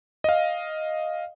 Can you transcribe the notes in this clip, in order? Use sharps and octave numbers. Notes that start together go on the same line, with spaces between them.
D#5 F5